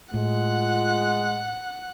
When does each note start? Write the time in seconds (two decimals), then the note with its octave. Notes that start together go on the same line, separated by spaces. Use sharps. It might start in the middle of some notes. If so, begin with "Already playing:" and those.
0.14 A2 G#3 F4 F#5 F#6